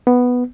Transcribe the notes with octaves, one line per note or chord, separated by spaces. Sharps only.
B3